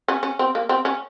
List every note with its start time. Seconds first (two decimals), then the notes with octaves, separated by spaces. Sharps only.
0.08 C#4
0.23 C#4
0.39 C4
0.55 A#3
0.69 C4
0.85 C#4